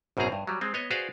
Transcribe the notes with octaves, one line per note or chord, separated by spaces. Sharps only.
G#1 F#2 B2 C4 G#4 A#5
G2
F#3 G3
G#3 C4
B3 C#5 D#5
F#4 G#4 B4 C5 D5 F5